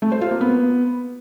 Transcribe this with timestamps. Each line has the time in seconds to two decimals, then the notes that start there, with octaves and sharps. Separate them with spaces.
0.02 A3
0.12 C5
0.21 F4
0.31 A#3
0.41 B3